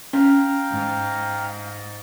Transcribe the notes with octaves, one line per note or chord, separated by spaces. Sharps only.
C#4 F5 G5 A#5
G#2